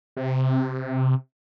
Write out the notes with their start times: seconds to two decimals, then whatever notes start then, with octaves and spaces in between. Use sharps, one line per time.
0.17 C3